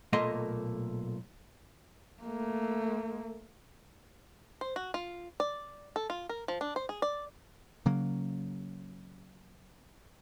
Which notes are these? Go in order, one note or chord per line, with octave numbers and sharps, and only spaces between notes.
B1 A#2 A3 A#3 D#5 C6
A3 A#3
C5
F#4
F4
D5
A4
F4
A#4
F3
D4
C5
G#4
D5
C#3 F#3 A#3